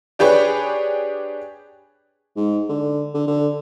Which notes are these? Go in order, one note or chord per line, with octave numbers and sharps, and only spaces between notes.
D4 G4 G#4 B4 C#5
G#2
D3
D3
D3